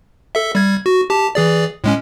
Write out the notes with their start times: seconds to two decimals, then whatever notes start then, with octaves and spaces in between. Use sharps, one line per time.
0.35 A4 E5
0.55 G3 G#6
0.86 F#4
1.10 G4 A5
1.35 E3 G#4 D5
1.84 A2 G#3 C#4